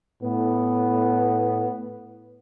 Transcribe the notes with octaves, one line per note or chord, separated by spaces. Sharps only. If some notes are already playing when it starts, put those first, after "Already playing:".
A2 B3